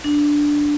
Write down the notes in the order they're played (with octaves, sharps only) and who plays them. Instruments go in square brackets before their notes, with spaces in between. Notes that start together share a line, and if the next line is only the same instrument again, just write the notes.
[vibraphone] D4